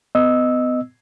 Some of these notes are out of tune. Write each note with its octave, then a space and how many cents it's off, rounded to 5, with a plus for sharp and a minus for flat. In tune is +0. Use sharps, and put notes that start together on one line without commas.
B3 +35 D#5 +0 E6 -10